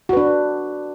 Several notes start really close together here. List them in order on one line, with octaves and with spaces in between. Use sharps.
F#4 B4 D4